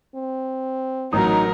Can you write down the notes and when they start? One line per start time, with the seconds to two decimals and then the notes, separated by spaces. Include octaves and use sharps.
0.15 C4
1.13 A1 F#3 D#4 A#4 D#6